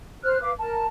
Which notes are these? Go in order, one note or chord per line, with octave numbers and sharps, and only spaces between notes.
C5 F6 F#6
B4 F5 D6
A#4 A5